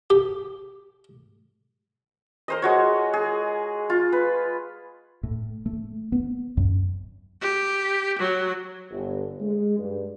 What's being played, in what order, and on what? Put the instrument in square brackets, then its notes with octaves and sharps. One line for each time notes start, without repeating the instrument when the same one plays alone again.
[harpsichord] G4
[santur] A#4 C5 D#5
G#3 F#4 C#5
G#4
F4
B4
[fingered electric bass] A2
A3
B3
F#2
[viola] G4
F#3
[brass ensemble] G1
G#3
G2